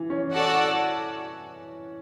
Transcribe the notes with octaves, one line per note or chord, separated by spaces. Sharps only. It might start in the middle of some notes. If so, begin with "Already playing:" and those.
Already playing: E3
C#4
F#4 A4 D5 F#5 A5